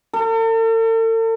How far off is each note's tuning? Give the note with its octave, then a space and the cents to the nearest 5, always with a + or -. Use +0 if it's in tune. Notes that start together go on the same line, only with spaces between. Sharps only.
A4 +45